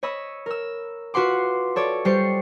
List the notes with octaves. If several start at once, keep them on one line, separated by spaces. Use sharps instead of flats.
C#5 D#5 B5 E6
A#4 E6
F4 F#4 B4 F#5 C6 D6
A4 C#5 D5
G3 G4 C5 C#6 C7 C#7